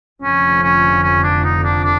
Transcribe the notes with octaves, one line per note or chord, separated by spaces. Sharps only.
F1 F2 D3 F3 C#4
C#4
C#4
D4
D#4
D4
D4